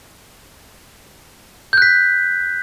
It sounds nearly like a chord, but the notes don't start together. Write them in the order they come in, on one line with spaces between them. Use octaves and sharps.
G6 F#6 B6